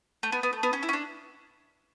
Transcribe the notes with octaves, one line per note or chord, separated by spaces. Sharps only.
A3
B3
B3
A3
B3
C#4
E4
C#4
D4